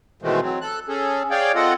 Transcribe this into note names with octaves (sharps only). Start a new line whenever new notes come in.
B2 D#3 E3 G#3 A3 C4
F#3 C4
A4 F#6
C#4 G#4 A4
G#4 C#5 D5 F5 G5
C4 F4 A4 D#5 F#5